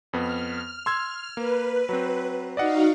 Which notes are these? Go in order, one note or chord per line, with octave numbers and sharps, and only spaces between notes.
F2 B3 F6
C6 E6 G#6
A#3 B4
F#3 C4
D#4 F#4 D5 D#5 F5 F#5